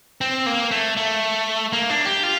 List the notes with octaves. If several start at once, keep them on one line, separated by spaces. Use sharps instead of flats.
C4
A#3
A3
A3
A#3
D4
G4
F4